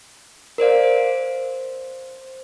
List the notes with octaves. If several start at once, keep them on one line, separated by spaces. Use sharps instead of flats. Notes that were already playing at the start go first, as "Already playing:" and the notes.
A#4 C5 D5 F5
C5